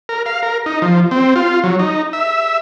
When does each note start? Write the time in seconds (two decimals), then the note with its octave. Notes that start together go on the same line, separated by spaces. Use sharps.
0.09 A#4
0.26 F5
0.43 A#4
0.66 D#4
0.82 F3
1.11 C4
1.36 F4
1.64 F#3
1.79 D#4
2.13 E5